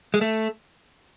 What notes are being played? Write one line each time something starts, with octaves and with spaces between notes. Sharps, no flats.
G#3
A3